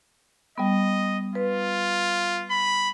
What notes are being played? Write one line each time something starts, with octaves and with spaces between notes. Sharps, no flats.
G3 B3 D#5
F4 B4
B5